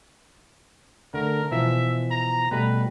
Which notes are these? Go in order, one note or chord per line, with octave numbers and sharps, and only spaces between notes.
D3 A3 A#4
B2 E3 F3 E5
A#5
B2 G3 A3 B4